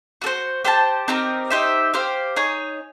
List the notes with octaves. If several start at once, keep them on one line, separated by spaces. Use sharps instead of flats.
F#4 A4 C5
G4 C5 F5 A5
C4 D#4 G4 A#4
D#4 G4 C5 E5
G4 C5 F5
D#4 G#4 C#5